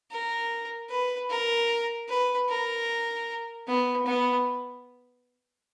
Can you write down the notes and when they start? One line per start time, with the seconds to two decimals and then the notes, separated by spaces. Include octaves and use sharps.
0.11 A#4
0.90 B4
1.30 A#4
2.08 B4
2.49 A#4
3.67 B3
4.06 B3